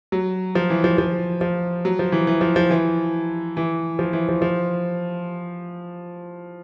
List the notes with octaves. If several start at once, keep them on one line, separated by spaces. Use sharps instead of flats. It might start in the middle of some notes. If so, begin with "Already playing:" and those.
F#3
F3
E3
F3
F3
F3
F#3
F3
E3
E3
F3
F3
E3
E3
F3
E3
F3
F3